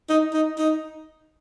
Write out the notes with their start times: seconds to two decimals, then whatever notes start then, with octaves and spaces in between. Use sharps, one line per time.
0.09 D#4
0.34 D#4
0.58 D#4